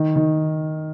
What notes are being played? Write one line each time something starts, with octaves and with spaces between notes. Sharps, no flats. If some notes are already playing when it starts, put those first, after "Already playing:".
Already playing: D#3
D#3